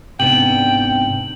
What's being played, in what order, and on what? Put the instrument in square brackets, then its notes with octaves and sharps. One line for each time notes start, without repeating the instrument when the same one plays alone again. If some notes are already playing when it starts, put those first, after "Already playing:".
[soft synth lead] G#2 [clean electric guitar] C3 B3 D4 [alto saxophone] G5 [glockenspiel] F#7